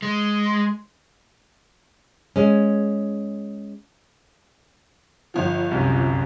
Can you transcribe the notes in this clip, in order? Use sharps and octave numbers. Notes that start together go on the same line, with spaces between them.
G#3
G#3 C#4
G1 F3
C2 F#2